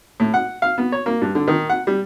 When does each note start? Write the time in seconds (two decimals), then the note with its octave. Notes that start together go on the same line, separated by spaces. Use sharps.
0.20 A2
0.34 F#5
0.62 F5
0.78 B3
0.92 C#5
1.06 A#3
1.22 G2
1.35 D3
1.48 D#3
1.69 F#5
1.87 G3